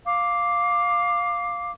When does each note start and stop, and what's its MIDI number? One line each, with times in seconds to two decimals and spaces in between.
0.05 1.71 77
0.05 1.71 86